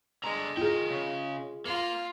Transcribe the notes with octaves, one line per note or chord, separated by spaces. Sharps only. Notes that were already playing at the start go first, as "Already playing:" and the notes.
D3 G#3 A#5
F4 G#4 A#4 G5
C#3
A#3 F4